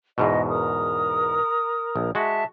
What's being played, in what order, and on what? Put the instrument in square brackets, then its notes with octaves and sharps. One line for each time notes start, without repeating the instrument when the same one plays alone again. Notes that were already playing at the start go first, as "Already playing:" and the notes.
[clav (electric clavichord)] E2 G#2 B2 [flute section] D#5
[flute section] A#4 A#5 D#6
[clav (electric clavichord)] A#1
[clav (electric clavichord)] G#3 F#4 [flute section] E5 A5